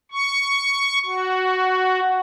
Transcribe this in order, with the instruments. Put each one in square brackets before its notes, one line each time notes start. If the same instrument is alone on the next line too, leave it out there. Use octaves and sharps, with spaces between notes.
[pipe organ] C#6
F#4